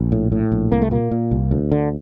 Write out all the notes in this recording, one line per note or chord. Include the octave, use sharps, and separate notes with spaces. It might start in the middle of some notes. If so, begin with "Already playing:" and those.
Already playing: A#1
A2
A2
A#1
C2 A#3
A3
A#2 A#3
A#2
C2
D2
D3